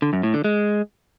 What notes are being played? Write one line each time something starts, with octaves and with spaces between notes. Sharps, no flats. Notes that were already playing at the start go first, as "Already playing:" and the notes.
D3
F#2
A2
D3
G#3